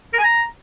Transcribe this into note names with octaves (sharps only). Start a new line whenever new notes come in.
A#4
G#5
A#5